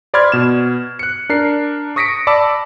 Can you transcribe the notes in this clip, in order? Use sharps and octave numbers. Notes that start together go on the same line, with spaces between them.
C5 D5 B5 C6 F6 G#6
B2 E7
F#6 C#7
D4 A#4 C7
C#6 D#6 A#6 B6 C#7 D7
D5 A5 B5 D6 E6